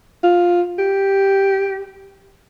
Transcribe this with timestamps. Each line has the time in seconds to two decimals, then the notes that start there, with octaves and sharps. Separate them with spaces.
0.23 F4
0.79 G4